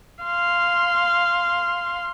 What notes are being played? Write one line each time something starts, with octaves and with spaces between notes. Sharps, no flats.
F5 C6